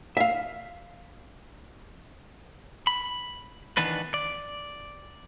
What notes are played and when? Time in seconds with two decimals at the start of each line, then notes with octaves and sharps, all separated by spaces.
0.17 E5 F5
2.87 B5
3.77 D#3 E3 B3 D4 B4
4.14 D5